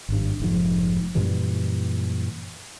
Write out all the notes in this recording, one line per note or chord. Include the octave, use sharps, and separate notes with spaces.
G#1 G2
F1 G#2 F3
F#2 A#2 E3 G3